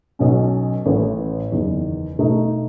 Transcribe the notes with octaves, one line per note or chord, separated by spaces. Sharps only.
B1 B2 F#3 C#4
A1 A2 E3 A3
F#1 E2 D#3
B2 A3 D#4